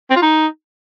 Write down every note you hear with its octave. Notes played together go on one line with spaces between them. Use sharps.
C4
F4
D#4